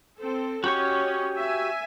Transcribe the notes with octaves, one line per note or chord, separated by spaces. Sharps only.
C4 A4
C#4 F#4 G4 C#5 D#5 C#6
E5 G#5